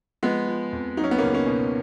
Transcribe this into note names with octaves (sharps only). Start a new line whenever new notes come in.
F3 G#3 B3
F3
F2
F#3 D#4
C#4
B3
C#2 A#3 C#4
A#3 C#4
B2